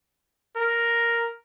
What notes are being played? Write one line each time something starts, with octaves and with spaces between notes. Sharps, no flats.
A#4